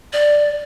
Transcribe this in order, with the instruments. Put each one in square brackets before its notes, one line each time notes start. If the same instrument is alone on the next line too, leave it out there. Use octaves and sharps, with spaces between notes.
[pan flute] D5